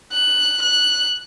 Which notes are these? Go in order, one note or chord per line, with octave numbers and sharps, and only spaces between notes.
F#6
F#6